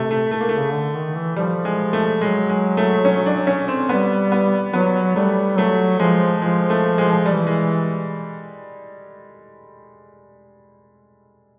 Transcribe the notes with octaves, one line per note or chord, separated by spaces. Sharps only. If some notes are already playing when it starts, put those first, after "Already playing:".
Already playing: C3 A3
A3
A3
A#3
C#3 A3
D3
D#3
E3
F3 G3
G#3
A3
F#3 G#3
G#3
A3
C#4
D4
C#4
C4
G3 B3
B3
F#3 B3
G3 A3
F#3 A3
F3 G#3
F3 G#3
A3
G#3
E3 G3
G#3